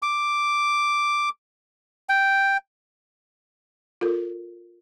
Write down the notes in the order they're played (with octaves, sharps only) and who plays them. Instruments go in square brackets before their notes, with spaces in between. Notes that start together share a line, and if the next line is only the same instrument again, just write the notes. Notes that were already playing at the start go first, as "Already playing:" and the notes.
[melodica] D6
G5
[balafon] F4 A4 A#4